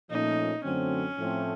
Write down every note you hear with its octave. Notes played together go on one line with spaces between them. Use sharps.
A#2 F3 A3 C#4 D#4
F#2 D3 F#3 A3 C4 C#4
A2 F3 A3 C4